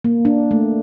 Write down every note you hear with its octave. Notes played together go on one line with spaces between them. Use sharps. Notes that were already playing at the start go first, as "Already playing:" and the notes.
A#3
D4
A3